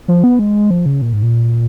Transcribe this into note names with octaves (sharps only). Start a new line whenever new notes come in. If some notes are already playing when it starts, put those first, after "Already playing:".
F3
B3
G#3
F3
C#3
A#2
G#2
A#2